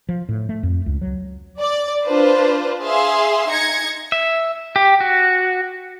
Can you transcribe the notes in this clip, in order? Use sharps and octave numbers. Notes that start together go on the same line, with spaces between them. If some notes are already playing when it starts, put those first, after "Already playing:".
F3
A2
A3
F2
C#2
F#3
D5
D4 F4 B4 C5
G#4 E5 F5 C6
D#4 G#6 A#6 C#7
E5
G4
F#4